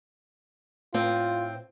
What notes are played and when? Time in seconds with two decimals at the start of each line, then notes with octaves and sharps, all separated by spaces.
0.94 A2 C4 F4